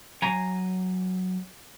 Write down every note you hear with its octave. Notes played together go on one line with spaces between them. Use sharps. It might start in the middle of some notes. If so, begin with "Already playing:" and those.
F#3 G#5 A#5